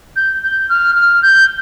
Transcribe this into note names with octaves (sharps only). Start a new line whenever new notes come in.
G6
G6
F6
F6
G6